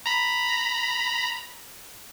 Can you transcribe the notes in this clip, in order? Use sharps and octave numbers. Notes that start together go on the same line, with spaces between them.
A#5 B5